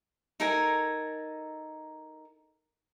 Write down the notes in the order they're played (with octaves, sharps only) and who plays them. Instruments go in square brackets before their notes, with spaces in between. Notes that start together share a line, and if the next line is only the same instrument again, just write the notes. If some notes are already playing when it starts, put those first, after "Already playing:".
[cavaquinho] D#4 A4 A#4 G#5